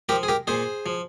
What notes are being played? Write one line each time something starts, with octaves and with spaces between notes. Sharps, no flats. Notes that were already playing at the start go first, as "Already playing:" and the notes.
F3 G4 A#4
G#4
G4 A#4
A#2 G#4 C5
F3